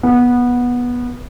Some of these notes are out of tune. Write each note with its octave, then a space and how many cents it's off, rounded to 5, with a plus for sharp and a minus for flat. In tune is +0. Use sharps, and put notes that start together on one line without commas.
B3 -15